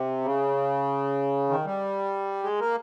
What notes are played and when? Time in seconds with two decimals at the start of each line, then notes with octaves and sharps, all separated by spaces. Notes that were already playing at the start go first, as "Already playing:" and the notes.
Already playing: C3
0.24 C#3
1.49 D#3
1.65 G3
2.43 G#3
2.60 A#3